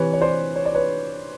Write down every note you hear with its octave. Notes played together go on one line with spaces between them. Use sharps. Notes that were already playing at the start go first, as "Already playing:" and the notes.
Already playing: C3 E3 B4 C#5
C#5
C5 D5
C#5
D5
B4 C#5